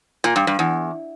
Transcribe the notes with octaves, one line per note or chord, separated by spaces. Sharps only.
A#2
G2
G2
E2